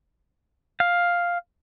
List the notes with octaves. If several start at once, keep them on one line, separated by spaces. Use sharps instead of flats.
F5